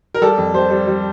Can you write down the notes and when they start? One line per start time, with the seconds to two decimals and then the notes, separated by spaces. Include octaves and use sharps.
0.14 A#4
0.22 G3 A4
0.38 F2
0.54 G3 C5
0.71 G3
0.87 G3